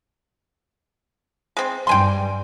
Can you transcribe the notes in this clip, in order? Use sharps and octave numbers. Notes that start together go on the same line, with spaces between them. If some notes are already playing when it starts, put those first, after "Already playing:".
G#3 C4
G2 G5 G#5 C6